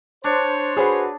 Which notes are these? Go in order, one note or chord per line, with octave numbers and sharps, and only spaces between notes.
D4 C5 C#5
F#4 G#4 B4 C5 B5